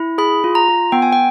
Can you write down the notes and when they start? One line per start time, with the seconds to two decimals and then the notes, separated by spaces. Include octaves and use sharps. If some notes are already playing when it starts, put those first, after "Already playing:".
Already playing: E4
0.18 G#4 B5
0.44 F4
0.55 A#5
0.69 F4
0.92 B3 G5
1.02 G#5
1.13 G5